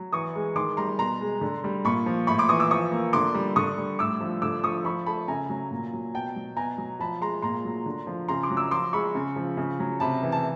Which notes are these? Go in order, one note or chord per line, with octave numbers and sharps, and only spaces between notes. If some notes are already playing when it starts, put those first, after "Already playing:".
Already playing: F#3
E3 C#6 D#6
G#3
D#3 C6 D6
G3 A#5 C6
B2 A#5 C6
G#3
D3
G3
A#2 B5 C#6
F3
A2 B5 C#6
C6 D6
E3 C#6 D#6
D6 E6
F3 C#6 D#6
A#3
D3 C6 D6
G3
D3 C#6 D#6
G3
A2 D6 E6
F3
D3 D6 E6
F3 C#6 D#6
F3 B5 C#6
A3 A5 B5
C#3 G#5 A#5
F#3
A#2
F#3
B2 G5 A5
F#3
B2 G#5 A#5
F#3
F3 A5 B5
G#3 A#5 C6
A#2 A#5 C6
F#3
D3
F3
C#3 A#5 C6
C6 D6
F#3
D6 E6
F3 C6 D6
G#3 B5 C#6
C#3
F3
C#3
F#3
C3 A5 B5
E3
A5